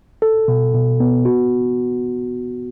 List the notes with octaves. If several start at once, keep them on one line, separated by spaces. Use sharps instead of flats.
A4
B2
B2
B3
F#4